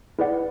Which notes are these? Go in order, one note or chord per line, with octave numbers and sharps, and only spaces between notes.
E4 G#4 B4 D5 F#5